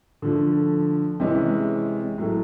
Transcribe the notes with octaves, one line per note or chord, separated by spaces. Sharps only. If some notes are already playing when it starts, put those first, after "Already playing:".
D3 F3 A3
C3 E3 G#3 C#4
A2 F#3 A3